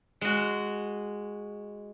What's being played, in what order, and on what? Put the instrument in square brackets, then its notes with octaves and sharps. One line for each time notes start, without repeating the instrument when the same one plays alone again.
[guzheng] G#3 F#4